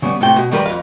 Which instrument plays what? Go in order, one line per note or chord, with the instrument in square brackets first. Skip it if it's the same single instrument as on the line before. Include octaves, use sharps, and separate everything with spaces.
[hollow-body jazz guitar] C#3 G3 B3
A2 C3 G5
B2
D#3 G3 A#4 B4 B5
F2 F5